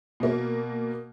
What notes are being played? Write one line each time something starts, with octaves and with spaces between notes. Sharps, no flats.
B2 A#3